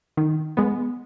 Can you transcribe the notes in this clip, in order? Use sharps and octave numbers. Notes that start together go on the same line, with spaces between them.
D#3
G#3 B3